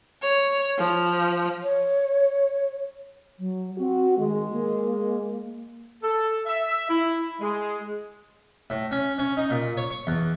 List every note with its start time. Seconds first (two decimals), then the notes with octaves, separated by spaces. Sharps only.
0.22 C#5
0.78 F3
1.63 C#5
3.39 F#3
3.78 C4 F#4
4.17 D#3 G#3
4.52 A#3
6.03 A4
6.46 E5
6.90 E4
7.40 G#3
8.70 A2
8.91 C#4
9.18 C#4
9.37 D#4
9.50 A#2
9.77 C#5
9.91 C#6
10.07 E2